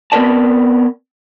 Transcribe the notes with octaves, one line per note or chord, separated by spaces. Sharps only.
B3 C4 A#4 B4 D5 A5